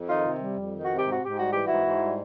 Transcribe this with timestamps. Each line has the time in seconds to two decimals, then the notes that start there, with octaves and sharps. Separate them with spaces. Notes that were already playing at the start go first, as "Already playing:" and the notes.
Already playing: F2
0.09 D#3 D#4 F4
0.25 C3
0.41 G3
0.57 F2
0.72 D#3
0.83 F#4
0.89 C3
0.98 G4
1.05 G#2
1.11 F#4
1.21 G#2 G4
1.37 G3 F#4
1.52 E3 G4
1.66 G#2 E4 F#4
1.85 G#2
2.01 G3